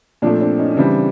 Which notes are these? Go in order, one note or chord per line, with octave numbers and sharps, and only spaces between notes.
A#2 F3 A3 C4 D4
C4 D4
C#4 D#4
C#4
C#3 E3 G3 C4 D4